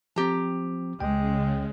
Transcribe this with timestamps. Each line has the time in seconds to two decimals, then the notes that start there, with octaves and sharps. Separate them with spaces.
0.16 F3 C4 G4 A#5
1.00 C#2 C#3 G#3 G5